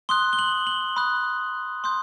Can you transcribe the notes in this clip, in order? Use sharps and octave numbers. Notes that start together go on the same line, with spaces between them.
C6 D#6 F#6 G7
G7
F#7
F#7
B5 D#6 F#6
C6 D#6 G6